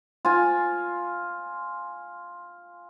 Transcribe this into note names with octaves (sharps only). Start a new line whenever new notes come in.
F4 G#5